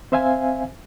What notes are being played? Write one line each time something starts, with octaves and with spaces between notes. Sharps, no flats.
C4 C5 E5 F5 G#5